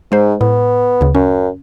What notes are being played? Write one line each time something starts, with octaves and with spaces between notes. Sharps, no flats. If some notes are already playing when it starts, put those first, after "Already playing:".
G#2 G#3 C5
A2 B3
D2 C#3
F#2 C#4